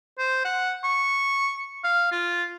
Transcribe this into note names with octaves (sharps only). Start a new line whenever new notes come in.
C5
F#5
C#6
F5
F4